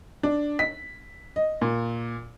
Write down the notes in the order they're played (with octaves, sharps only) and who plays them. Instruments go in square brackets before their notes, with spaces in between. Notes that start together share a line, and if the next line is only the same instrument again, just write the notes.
[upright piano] D4
B6
D#5
A#2